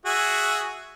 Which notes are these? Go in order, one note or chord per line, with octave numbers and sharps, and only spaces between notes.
F#4 G#4 E5